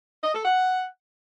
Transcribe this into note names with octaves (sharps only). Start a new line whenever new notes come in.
D#5
A4
F#5